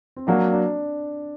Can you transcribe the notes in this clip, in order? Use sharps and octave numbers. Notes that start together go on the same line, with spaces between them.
C4
F#3 A#3 D4 F#4
D4